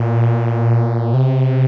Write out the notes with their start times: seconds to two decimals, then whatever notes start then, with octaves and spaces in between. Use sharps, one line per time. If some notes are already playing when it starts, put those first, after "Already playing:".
Already playing: A#2
1.14 C3